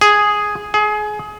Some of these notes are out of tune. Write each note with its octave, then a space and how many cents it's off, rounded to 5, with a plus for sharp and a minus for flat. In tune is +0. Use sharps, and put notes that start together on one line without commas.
G#4 +0
G#4 +25